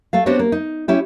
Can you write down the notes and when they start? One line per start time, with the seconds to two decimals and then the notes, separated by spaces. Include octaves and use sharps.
0.13 A3 A4 F5
0.26 B3 C4 D4 F#4 G4 C#5
0.39 A#3
0.52 D#4
0.88 C#4 E4 G4